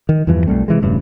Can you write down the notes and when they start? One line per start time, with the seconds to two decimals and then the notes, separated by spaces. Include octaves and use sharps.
0.09 D#3
0.27 E2 G2 E3 F3
0.46 B1 G3 A3 C4
0.68 C3 E3 G#3
0.82 E1 G2 C#3 A3